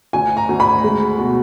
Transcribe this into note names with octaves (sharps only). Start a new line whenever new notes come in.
D2 G#5
A#5
D2
B5
G#3
B2